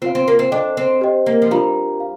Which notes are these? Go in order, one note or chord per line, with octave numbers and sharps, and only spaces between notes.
C4 F4 C5 F5
C4
A#3
C4
D4 A4 C5 D#5 G5
C4
G4 C5 D#5 G5
A#3
F3
G3 D4 F4 A#4 F5 A#5
F5